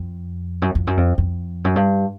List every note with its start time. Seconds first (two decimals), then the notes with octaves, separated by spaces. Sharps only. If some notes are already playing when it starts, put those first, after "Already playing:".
Already playing: F2
0.62 F#2
0.75 F2
0.87 F#2
0.97 F2
1.18 F2
1.65 F#2
1.76 G2